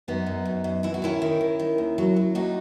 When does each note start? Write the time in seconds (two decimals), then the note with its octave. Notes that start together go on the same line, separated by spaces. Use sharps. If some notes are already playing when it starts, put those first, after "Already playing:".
0.08 F#2 B3 D#4
0.26 F#2
0.45 F#2
0.64 F#2
0.83 F#2 E4
0.94 F#4
1.02 D#3 C#4 E4
1.22 D#3
1.41 D#3
1.59 D#3
1.78 D#2
1.98 F#3
2.16 F#3
2.35 D#2 D#4 F#4